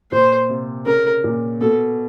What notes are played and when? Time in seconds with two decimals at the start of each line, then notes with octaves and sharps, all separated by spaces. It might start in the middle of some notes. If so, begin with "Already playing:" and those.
0.12 A#2 C5
0.49 C3
0.86 C#3 A#4
1.24 A#2
1.61 B2 A4